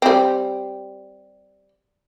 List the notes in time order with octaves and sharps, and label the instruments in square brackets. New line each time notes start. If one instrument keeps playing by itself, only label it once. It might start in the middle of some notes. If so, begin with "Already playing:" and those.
[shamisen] G3 C4